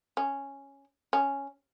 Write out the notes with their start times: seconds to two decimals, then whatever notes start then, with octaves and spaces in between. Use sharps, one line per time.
0.17 C#4
1.13 C#4